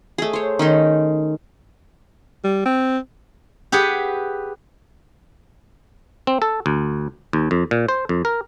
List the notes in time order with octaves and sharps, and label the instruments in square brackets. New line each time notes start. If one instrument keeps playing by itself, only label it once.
[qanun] A3 G#4
C5 C#5
D#3 C#4 D#4 C5
[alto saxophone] G3
C4
[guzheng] G4 G#4 B4 F#5
[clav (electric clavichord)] C4
A4
D2
D#2
F2
A#2
C5
F2
A#4